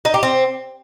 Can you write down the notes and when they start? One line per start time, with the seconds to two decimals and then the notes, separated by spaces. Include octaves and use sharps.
0.05 D#4
0.14 G4
0.23 C4